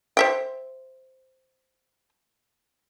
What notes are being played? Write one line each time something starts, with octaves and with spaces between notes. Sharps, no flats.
C5 E5 G5